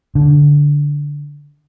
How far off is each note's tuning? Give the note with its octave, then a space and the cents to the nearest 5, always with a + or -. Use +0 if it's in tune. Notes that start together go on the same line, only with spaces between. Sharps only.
D3 -10